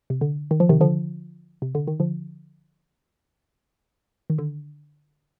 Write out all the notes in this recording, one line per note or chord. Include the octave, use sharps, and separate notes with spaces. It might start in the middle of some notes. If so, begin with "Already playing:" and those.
C3
D3
D#3
F3
C3 D#3
D3 F3
C3
D3
D#3
D3 F3
D#3
D3